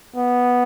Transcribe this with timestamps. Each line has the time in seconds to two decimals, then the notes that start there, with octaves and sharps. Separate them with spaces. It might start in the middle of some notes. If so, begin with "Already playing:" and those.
0.16 B3